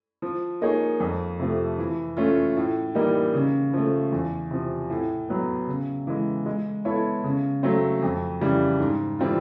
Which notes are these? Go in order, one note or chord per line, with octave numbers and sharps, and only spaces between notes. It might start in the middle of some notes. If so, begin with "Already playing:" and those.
F3
A#3 D#4 G#4 C#5
F2
C3 F3 A3
E3
A3 C#4 F4
A2
E3 G3 A#3 D#4
C#3
F3 A3
E2
C3 F3
A2
F#3 B3
C#3
E3 G#3
G#3
B3 E4 A4 C#5
C#3
F#3 A3 C4
F2
C#3 E3 G3
G#2
E3 G3 C4 F4